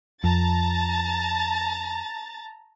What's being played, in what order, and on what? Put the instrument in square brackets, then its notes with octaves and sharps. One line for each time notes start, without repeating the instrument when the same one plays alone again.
[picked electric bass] F2 [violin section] A5 A#5 A6